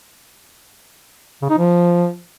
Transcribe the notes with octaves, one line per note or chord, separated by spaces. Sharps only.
C#3
D#4
F3